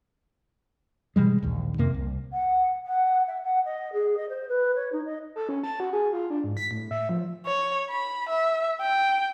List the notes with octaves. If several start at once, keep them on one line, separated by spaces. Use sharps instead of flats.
B2 E3 G3 G#3
A#1 D#2
F2 C3 A#3
C2
F#5
F#5
E5
F#5
D#5
G#4
D#5
C5
B4
C#5
D#4
D#5
A4
C#4
A5
F#4
G#4
F4
D4
G#2
B6
A2
E5
F3
C#5
B5
E5
G5